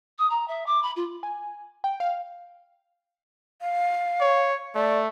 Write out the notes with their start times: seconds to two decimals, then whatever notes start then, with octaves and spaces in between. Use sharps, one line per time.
0.18 D#6
0.30 A#5
0.48 E5
0.66 D6
0.83 B5
0.96 F4
1.23 G#5
1.84 G5
2.00 F5
3.62 F5
4.20 C#5
4.75 A3 D5